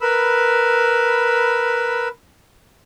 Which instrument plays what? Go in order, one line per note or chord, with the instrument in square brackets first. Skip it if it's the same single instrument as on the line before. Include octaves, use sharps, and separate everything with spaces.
[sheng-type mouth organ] A#4 B4 B5 E6